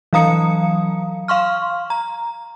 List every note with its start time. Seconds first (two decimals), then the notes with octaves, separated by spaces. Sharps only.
0.13 E3 F#3 F5 A#5 D#6 C#7
1.28 F5 C6 C#6 F6
1.90 A#5